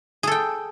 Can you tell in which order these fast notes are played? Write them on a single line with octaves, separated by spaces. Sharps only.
G#4 A4 G5